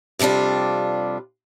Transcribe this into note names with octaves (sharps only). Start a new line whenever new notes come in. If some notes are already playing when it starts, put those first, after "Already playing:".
F2 C3 G3 D4 F4